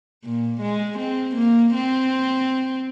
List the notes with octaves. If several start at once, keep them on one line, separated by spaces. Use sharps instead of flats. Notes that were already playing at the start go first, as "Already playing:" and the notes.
A#2
G#3
C4
A#3
C4